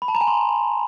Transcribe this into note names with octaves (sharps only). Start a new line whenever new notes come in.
B5
A5
A#5
G#5
C6